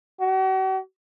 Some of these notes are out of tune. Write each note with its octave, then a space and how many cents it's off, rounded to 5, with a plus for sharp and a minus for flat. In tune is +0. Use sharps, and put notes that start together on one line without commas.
F#4 +45